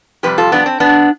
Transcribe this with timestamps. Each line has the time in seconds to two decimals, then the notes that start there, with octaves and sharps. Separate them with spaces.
0.23 F2 C3 G3 G4 B4
0.38 F4 A4
0.52 B3 D4
0.66 C4
0.80 B3 D4